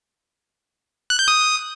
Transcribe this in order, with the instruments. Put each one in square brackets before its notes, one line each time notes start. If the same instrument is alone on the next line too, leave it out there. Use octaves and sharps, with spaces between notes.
[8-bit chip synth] F#6
G6
D#6